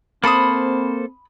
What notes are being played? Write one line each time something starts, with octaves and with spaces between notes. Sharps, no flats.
A#3 C4 A4 C5 B5 D#6